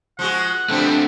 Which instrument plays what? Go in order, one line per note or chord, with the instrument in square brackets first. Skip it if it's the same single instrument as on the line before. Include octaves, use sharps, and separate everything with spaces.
[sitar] F3 G#3 F#4 [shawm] F#5
[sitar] B2 F3 G3 [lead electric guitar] A3 C4 [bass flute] D4